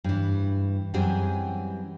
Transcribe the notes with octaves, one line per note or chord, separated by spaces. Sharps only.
G2 E3
F#2 E3 G3 C4 G#4 G5